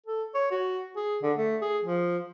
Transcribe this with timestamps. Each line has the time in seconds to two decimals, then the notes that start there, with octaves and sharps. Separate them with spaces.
0.06 A4
0.34 C#5
0.51 F#4
0.96 G#4
1.22 D3
1.38 A3
1.62 G#4
1.84 F3